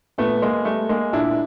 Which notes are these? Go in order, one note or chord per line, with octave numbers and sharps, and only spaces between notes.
A#2 A3 B3
G#3 A#3
G3 A3
G#3 A#3
A#2 D4 E4